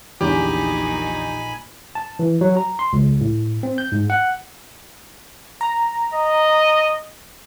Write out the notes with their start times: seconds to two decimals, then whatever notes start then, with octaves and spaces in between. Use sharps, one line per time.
0.21 A#1 E2 A#2 D3 D#4 G4 G#5 B5
1.95 A5
2.19 E3
2.41 F#3
2.57 A#5
2.79 C6
2.93 C#2
3.21 A2
3.63 C4
3.78 G6
3.92 G#2
4.10 F#5
5.61 A#5
6.14 D#5